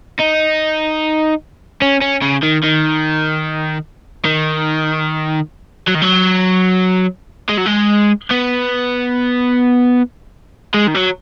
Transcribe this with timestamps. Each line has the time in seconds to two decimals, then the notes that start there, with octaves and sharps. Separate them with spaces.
0.19 D#4
1.82 C#4
2.01 C#4
2.22 C#3
2.42 D#3
2.63 D#3
4.25 D#3
5.87 F#3
5.95 D#3
6.02 F#3
7.49 G#3
7.58 F#3
7.66 G#3
8.31 B3
10.74 G#3
10.88 D#3
10.95 F#3